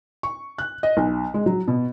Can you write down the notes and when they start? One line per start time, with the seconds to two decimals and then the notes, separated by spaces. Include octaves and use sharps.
0.23 C#6
0.58 F#6
0.83 D#5
0.97 B1
1.34 G#3
1.46 F#3
1.68 B2